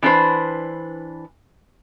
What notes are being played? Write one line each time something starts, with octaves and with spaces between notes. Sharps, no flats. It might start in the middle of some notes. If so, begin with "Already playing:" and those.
E3 D4 B4 C5